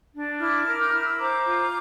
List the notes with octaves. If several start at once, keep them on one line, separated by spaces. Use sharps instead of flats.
D4
E4 D6 F6
A#4
G6
E4 F6
E6
C5 A#5 D6
F4